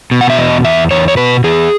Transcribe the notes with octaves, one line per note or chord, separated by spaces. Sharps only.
B2
F#5
E5
E2 D#5
E2 E5
E2 C#5
C#5
B2 B4
E2 G#4